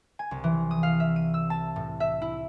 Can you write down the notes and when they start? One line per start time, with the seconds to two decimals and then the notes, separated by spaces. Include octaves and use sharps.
0.19 G#5
0.31 C2
0.44 E3
0.71 D#6
0.83 F5
1.00 E5
1.16 D#7
1.34 E6
1.50 A5
1.76 A2
2.00 E5
2.22 E4